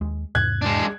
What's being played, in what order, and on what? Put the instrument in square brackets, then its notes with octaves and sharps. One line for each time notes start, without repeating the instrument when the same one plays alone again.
[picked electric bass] D#2 G#3
[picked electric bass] E2 G#2 C3 [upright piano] F#6 G#6
[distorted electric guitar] G#3 D4